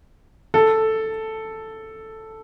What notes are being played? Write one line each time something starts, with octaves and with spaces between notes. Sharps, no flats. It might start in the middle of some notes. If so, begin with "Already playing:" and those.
A4